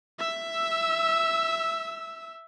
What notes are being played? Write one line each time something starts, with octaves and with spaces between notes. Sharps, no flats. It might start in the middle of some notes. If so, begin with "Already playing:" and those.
E5 E6